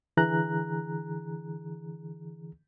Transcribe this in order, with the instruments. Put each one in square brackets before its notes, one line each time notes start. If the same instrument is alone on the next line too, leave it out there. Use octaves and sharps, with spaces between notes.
[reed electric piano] D3 E3 G#4 A#5 F#6